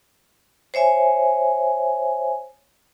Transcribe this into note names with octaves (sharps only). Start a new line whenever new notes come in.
C5 C#5 E5 G#5